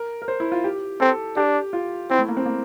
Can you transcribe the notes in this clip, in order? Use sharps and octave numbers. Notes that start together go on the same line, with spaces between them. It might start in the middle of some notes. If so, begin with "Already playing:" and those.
Already playing: A#4
A#4
C5
E4
F4
G4
C4 A4
D4 G4
F4
C4 E4
A3
A#3
C4
A#3